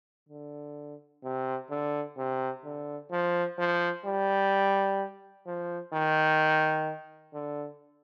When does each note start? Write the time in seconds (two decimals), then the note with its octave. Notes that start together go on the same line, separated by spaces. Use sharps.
0.29 D3
1.24 C3
1.70 D3
2.17 C3
2.64 D3
3.11 F3
3.58 F3
4.05 G3
5.46 F3
5.93 D#3
7.34 D3